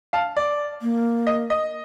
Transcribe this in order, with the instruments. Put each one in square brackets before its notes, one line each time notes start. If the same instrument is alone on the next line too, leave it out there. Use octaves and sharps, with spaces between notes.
[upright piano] F5 A5
D5
[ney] A#3
[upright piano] D#5
D#5